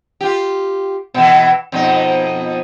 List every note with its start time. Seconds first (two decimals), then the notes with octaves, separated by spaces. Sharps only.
0.21 F4 G4
1.14 B2 E3
1.72 F2 B2 D#4